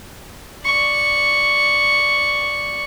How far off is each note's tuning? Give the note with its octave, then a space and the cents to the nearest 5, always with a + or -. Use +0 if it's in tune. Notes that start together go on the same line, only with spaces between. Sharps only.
D5 +0 C#6 +0